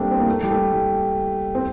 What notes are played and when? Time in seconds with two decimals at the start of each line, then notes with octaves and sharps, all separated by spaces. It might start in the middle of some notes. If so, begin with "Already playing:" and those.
Already playing: G3 A3 A#3 C4 D4
0.11 C4
0.20 A#3
0.28 A3
0.43 G3
0.51 A3
0.73 G3
1.55 C4